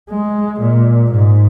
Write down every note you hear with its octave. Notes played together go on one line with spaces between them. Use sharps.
G#3
A#2
G#2